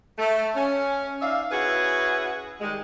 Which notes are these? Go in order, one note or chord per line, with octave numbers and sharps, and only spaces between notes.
A3
C#4
D#4 D5 E5 F5
C#4 E4 F#4 G#4 B4
D#3 G3 G#3